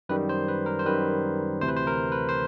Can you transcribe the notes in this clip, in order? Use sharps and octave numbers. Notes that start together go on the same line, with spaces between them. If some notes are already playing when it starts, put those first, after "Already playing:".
F#2 D#3 G3 B4
C5
B4
A#4
C5
F#2 D#3 G3 B4
D2 C3 E3 C5
B4
C5
A#4
B4
C5